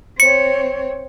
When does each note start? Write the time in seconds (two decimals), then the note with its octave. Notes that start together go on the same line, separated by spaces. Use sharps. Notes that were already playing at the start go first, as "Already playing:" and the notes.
0.20 C4 C#5 C#7